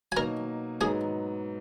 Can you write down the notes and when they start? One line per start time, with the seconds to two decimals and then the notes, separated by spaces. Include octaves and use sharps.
0.12 G#5
0.16 B2 F#3 A#3 D#4 A#4 A#5
0.81 G#2 F#3 B3 D#4 G#4 G#5